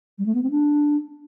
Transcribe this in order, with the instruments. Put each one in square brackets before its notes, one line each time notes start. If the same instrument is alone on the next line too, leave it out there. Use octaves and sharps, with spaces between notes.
[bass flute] G3
A3
B3
C4
D4